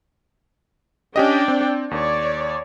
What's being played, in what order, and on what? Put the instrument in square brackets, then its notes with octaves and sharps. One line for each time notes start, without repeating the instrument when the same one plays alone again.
[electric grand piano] C#4 G4 D#5 [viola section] D4 D5 G5
[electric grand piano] C4
[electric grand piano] D#2 [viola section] C#5 D5